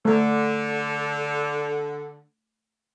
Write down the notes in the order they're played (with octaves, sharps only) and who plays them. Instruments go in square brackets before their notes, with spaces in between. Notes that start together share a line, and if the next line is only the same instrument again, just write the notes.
[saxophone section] D3 [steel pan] A3